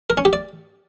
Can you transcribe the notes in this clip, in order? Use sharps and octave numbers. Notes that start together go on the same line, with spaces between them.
A#4
C#4
G4
D5